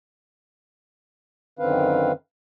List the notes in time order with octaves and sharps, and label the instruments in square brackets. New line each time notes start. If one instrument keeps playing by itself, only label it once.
[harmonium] F#2 D3 D#3 C4 B4 F5